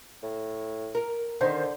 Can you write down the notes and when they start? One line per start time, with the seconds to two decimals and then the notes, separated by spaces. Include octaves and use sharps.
0.23 A2
0.95 A#4
1.41 D3 D#3 C5